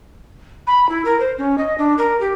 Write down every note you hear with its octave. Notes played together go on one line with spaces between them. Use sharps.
B5
E4
A#4
C5
C#4
D#5
D4
A#4
G4